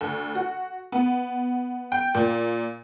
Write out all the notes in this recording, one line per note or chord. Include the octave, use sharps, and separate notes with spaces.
D2
F#4
B3
G5
A#2